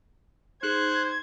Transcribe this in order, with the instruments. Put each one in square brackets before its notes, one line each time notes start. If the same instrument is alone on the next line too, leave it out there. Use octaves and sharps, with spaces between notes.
[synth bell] D#4 G#4 [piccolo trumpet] C5 [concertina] F#6 [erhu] G#6